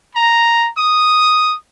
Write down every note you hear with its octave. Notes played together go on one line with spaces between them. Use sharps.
A#5
D#6